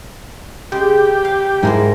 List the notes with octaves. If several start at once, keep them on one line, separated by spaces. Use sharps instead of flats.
C#3 G#3 G4
F5
G#2 G3 G#3 E4 A#4 C5